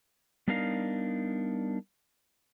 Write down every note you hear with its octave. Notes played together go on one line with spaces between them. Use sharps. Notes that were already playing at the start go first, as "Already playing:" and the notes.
G3 B3 D4 D#4 A#4 F5